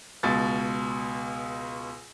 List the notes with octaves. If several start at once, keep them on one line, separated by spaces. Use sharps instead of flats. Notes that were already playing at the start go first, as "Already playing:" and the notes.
C#2 B2 A6